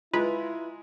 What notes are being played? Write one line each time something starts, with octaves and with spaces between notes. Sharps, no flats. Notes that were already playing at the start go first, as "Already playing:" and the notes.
G#3 E4 F4 B4 A#5